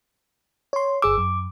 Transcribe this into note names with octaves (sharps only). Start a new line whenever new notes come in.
C#5 C6
G1 G#4 D6 E6
F#2